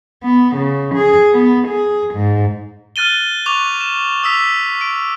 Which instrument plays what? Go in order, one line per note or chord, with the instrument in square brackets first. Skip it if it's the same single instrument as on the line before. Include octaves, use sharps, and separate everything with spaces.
[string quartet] B3
C#3
G#4
B3
G#4
G#2
[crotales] F6 F#6 A6 D#7 G7
C#6 D6 F#6 F7
E7
D#6 E6 B6 F7
D7